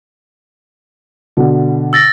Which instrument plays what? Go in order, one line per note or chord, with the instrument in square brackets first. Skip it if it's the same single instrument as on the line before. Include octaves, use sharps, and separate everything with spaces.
[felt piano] B2 D3
[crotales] E6 A6 A#6